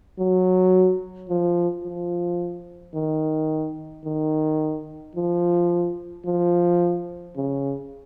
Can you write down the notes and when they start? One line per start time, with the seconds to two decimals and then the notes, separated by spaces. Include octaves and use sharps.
0.19 F#3
1.30 F3
1.84 F3
2.95 D#3
4.05 D#3
5.15 F3
6.25 F3
7.37 C#3